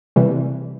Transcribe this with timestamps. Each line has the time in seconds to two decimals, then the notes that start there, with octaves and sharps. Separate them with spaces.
0.16 C3 E3 G3